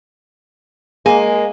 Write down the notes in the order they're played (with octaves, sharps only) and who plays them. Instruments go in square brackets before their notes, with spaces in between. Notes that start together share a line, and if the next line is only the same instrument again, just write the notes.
[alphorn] G#3 [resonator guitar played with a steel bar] A#3 [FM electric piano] G#4 [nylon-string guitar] G#5